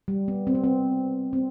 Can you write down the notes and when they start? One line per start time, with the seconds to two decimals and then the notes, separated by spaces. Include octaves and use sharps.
0.08 G3
0.28 B3
0.47 C4
0.55 B3
0.64 C4
1.33 C4